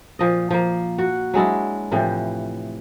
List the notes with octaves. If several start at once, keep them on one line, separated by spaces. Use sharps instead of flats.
A#2 F3 D#5
F3 A#3
F#4
F#3 G#3 D4 E4
A2 C3 E3 F3